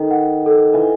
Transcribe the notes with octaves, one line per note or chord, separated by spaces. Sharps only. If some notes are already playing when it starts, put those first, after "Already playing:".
Already playing: D#3 A4
F#5
A4
E3